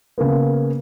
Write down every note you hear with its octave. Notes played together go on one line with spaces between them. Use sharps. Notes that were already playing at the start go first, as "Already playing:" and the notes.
C#3 A#3 B3